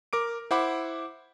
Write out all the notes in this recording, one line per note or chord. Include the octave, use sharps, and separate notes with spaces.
A#4 D6 D7
E4 C5 F#5 B5 D6